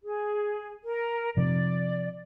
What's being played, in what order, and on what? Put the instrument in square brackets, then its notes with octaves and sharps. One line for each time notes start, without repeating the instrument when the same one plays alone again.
[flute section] G#4
A#4
[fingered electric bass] C3 F3 [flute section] D5